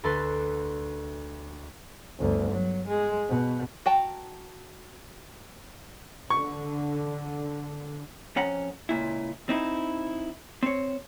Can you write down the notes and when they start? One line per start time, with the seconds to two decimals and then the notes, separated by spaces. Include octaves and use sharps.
0.03 D2 A4 B4 C6 A6
2.19 G1 D2
2.51 F#3
2.87 G#3
3.29 B2
3.86 F#4 G5 A5 A#5
6.30 D3 C#6
8.36 F2 C#4 F#5 A#5
8.89 C#2 A#2 E4
9.49 C4 D#4 E4
10.63 C4 C#5